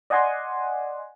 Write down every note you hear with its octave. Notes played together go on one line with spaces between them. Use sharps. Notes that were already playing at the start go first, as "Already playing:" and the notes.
D5 D#5 F#5 G#5 C6